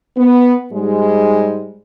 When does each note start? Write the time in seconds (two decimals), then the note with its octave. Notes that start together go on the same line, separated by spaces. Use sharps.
0.17 B3
0.72 G#2 G3 G#3